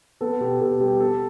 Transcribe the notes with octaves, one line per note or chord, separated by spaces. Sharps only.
B3 A4
B2 G4
B2 A4
G3 G4
B3 A4